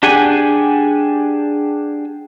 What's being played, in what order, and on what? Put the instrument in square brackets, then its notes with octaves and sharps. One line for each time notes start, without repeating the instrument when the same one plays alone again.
[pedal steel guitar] D4 G4 G#4 F#5 G#5